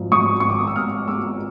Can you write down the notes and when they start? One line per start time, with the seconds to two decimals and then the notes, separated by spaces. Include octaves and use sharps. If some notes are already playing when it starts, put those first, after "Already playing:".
Already playing: G#1 G#2 F3
0.12 G#2 C#6 D#6
0.40 C#6
0.44 G#1
0.50 D6
0.59 D#6
0.67 E6
0.76 G#2 D#6 F6
1.08 G#3 D6 E6